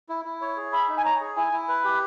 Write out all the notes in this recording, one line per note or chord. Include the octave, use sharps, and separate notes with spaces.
E4
E4
C#5
G#4
E5 B5
D#4
G#5
C#5 A#5
G#4
E4 G#5
E4
B4
G4